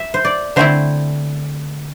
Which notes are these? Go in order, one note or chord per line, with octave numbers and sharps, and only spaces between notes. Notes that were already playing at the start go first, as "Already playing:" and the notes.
Already playing: E5
C5
D5
D3 A3 C4 E4 C5